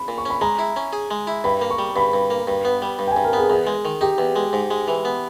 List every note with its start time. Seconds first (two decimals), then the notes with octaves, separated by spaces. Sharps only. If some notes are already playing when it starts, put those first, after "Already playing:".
Already playing: B5
0.08 A#2
0.18 C#6
0.25 C#4 B5
0.41 G#3 A#5
0.59 E4
0.76 C#4
0.93 G#4
1.11 G#3
1.27 E4
1.44 G2 B5
1.62 A#3
1.71 C#6
1.79 G3
1.96 G2 B5
2.13 G2
2.30 A#3
2.47 G2
2.65 B3
2.82 G3
2.99 G2
3.07 G5
3.11 G#5
3.17 G2
3.24 A#4
3.33 B3 G#4
3.50 E2
3.67 G#3
3.85 D#3
4.01 D#4 G4
4.18 E2
4.36 G#3
4.53 G#2
4.71 G#3
4.88 E3
5.05 B3